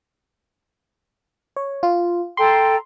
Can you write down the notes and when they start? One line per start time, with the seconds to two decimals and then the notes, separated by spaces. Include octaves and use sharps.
1.56 C#5
1.83 F4
2.37 A4 G5 A#5 C6